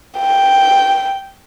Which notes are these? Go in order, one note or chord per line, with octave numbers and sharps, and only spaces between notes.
G5